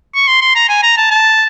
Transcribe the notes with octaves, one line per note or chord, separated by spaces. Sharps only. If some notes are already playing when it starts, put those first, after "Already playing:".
C#6
C6
C6
A#5
G#5
A#5
A5
A5